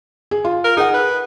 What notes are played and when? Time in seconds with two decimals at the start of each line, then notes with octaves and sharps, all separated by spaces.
0.31 G#4
0.45 F4
0.64 A#4
0.77 D#4 G#4 F#5
0.94 B4